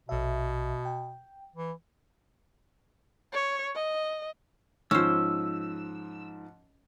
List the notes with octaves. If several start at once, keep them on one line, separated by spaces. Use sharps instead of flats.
A#1 B2 E5
G5
E3
C#5
D#5
G#2 F3 C#4 C5 E6